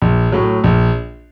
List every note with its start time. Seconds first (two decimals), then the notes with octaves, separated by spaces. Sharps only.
0.02 A#1
0.32 A2 F#3
0.64 A#1